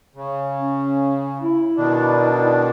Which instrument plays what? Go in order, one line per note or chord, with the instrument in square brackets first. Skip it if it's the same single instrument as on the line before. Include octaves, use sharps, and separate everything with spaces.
[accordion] C#3
[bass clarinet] C#4
E4
[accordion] B2 D#3 D4